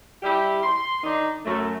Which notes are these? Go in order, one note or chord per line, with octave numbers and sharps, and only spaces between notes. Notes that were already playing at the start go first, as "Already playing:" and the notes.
G3 E4 G4
C6
D#3 D4 D#4
F#2 A3